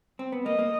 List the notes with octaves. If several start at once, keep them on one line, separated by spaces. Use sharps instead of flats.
C4
B3
A#3 D#5
A#3